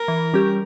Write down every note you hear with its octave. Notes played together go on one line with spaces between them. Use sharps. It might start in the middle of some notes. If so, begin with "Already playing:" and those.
Already playing: A#4
E3
G3 C#4 G4